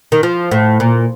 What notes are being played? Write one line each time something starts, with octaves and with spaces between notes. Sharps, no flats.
D#3
F3
A2
A#2